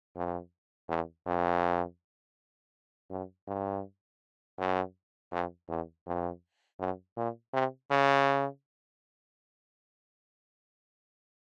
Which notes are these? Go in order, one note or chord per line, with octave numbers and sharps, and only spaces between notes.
F2
E2
F2
F#2
G2
F#2
F2
E2
F2
F#2
A#2
C3
C#3